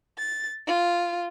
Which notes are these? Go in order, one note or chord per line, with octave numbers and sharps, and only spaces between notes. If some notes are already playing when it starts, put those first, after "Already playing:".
A6
F4